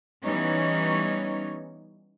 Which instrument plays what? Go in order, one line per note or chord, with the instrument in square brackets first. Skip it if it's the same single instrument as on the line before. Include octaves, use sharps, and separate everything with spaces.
[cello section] E3 G3 B3 C#4 D#4 C#5